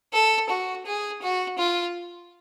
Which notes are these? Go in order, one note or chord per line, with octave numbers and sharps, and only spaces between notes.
A4
F#4
G#4
F#4
F4